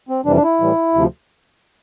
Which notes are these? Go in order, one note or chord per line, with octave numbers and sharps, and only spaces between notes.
C4
F2 C3 E3 G3 D4
D4
E4
A2 E3 G3
D2 C3 F3